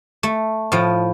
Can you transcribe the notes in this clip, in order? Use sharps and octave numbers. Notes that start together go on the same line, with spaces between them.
A3
A2 F3